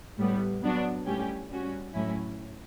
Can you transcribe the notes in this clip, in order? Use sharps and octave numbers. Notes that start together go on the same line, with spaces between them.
A2 G3 B3
F#3 B3 D4 F#4
A2 G3 C#4 G4
G3 C#4 F#4
A2 F#3 C#4 E4